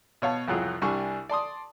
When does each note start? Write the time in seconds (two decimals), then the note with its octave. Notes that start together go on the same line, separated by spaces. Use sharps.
0.22 B2 C#5 F5 A5
0.48 C2 F2 F#3 F4 G#4
0.82 C2 G3 D4 G#5 C#6
1.29 D5 A5 C6 D#6